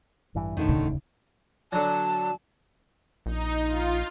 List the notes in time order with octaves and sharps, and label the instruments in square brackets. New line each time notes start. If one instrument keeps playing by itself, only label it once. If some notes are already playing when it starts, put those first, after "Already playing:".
[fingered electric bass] A1 G2 E3
[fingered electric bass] E2 [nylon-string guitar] A2 D3 D#3
[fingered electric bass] E1 D2 [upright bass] C#3
[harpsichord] D3 F#3 [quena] A5
[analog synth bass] A#1 [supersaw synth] D#4
[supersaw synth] F4